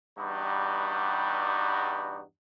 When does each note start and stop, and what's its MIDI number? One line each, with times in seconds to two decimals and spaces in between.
0.19 2.22 40
0.19 2.22 43
0.19 2.22 55
0.19 2.22 63
0.19 2.22 66